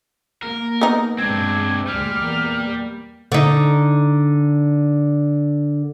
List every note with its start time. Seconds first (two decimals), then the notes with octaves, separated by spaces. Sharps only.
0.43 A#3 A#4
0.81 B3 D#4
1.18 G2 B2 G#3 C4 D4 G#6
1.87 D2 A#2 G3 G#3 F6
2.17 E2 A#3
3.32 D3 D#4